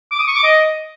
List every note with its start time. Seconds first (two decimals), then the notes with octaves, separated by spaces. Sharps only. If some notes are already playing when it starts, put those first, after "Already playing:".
0.11 D6
0.19 D#6
0.28 C#6
0.36 D6
0.44 D#5